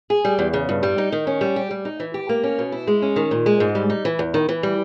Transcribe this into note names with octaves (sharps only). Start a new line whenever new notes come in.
G#4
G3
E2
C#3
G2
G3
D#4
D#3
C#4
G3
G4
G3
D#4
E3
G4
A#3
C#4
B2
E4
G#3
C#4
D#3
A#2
G#3
G#2
G3
D#4
E3
E2
D#3
E3
G3